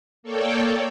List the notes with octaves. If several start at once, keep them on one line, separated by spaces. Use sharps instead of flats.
A#3 A4 C#5 D5 G5